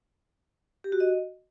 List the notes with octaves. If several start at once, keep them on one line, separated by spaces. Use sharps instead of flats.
G4
F#4
D#5